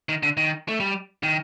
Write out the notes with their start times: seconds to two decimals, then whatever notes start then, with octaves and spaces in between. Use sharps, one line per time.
0.09 D#3
0.23 D3
0.37 D#3
0.68 A3
0.80 G3
1.23 D#3